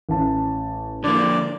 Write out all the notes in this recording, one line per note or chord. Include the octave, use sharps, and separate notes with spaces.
A1 A5
D3 F3 A#3 D5